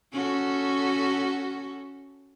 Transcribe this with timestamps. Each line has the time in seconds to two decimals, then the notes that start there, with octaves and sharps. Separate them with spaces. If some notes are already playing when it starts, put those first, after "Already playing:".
0.13 C#4 F#4 A4